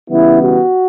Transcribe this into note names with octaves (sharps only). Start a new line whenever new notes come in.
C#3 E3 G3 B3 E4
F#4